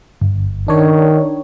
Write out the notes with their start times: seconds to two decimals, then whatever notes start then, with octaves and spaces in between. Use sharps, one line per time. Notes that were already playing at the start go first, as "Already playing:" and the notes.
0.21 G1
0.68 D#3 D4 C#5